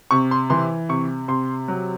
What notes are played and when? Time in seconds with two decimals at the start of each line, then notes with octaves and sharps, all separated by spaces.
0.11 C3 C#6
0.31 C6
0.50 E3 C6
0.89 C3 C#6
1.28 C3 C6
1.68 F#3